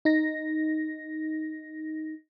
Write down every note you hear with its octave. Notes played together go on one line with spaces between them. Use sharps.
D#4 A#6